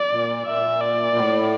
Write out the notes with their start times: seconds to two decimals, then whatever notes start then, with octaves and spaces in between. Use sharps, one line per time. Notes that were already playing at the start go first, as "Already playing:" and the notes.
Already playing: D5
0.12 A#2
0.46 A#2 E5
0.81 D5
1.16 A2